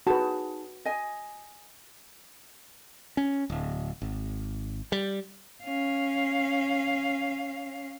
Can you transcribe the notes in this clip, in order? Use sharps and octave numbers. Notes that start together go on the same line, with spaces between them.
D#4 F#4 G#4 B4 A5
D#5 G#5
C#4
D1
G#1
G3
C#4 F5